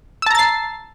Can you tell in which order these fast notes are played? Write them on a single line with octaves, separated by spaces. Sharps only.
E6 A5 A#5 A6 C7